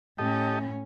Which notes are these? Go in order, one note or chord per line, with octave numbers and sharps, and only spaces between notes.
A2 C#4 G4 A4 D#5